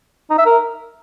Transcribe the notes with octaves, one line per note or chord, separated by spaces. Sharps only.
D#4
E5
A#4